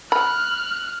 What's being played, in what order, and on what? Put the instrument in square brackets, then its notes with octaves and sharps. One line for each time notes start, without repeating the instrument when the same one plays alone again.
[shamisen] B5 [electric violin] F6 F#6